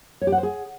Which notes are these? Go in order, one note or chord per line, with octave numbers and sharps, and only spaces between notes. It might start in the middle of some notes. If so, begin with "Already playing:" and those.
C#5
G4
F#5
C5
G#4